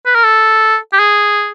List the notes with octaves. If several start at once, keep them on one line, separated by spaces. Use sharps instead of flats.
B4
A#4
A4
G4
G#4